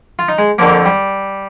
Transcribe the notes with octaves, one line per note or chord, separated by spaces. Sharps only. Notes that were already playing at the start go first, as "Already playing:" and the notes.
F4
D#4
G#3
F2 D3 F3 A#3
G3